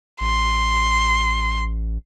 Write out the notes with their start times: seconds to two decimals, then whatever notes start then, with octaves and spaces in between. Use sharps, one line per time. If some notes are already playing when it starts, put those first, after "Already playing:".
0.20 A1 C6